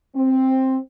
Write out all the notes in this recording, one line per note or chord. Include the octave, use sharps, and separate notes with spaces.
C4